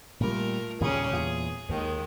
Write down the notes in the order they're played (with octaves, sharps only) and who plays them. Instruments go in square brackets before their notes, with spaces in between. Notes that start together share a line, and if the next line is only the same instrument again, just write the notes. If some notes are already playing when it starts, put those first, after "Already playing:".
[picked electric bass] A#2 G3 [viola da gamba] A3 F4 A#4
[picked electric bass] D#2 A#2 C#3 [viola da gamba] G3 C#4 G#4
[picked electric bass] E2 A#2 [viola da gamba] G#4
[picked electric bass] D#2 [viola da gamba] D#3 G#3